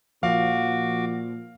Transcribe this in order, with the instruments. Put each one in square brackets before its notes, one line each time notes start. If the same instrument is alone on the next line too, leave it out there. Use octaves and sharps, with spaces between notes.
[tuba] A#2 [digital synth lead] F3 [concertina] F#4 D6 [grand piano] F5